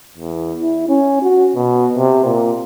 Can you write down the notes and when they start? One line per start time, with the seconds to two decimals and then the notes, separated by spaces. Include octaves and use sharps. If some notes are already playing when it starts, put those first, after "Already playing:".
0.17 E2
0.59 E4
0.89 C#4
1.22 F#4
1.56 B2
1.95 C3
2.25 A#2